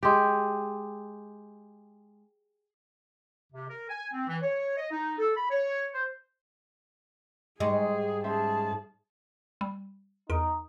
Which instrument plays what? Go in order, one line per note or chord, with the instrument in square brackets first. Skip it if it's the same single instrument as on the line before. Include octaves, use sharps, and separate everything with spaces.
[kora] G#3 G4
[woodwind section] C3
A#4
G#5
C4
E3
C#5
D#5
D#4
A4
B5
C#5
C5
[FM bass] G#2 [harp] G3 D#4 C#6 [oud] G#3 [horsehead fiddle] G#4
[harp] C#4 C5 E5 [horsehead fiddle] G#4 A5
[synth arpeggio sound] G3
[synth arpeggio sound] E2 A#4 D7 [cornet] D#4